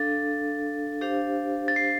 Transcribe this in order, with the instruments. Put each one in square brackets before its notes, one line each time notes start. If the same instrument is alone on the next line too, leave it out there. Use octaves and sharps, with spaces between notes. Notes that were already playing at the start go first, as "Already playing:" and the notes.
Already playing: [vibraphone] D4 A4 F5 [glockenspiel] A6
[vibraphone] D4 G4 C5 F5
[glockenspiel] A6
C7